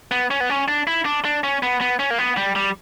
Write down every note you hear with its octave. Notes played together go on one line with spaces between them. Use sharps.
B3
C#4
B3
C#4
D4
E4
D4
D4
C#4
B3
B3
C#4
A#3
B3
G3
G3